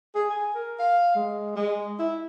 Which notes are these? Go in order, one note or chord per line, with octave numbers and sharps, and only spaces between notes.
G#4
G#5
A#4
F5
G#3
G#3
E4